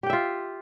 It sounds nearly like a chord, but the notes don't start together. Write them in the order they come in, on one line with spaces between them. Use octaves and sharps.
G4 G5 E5 F4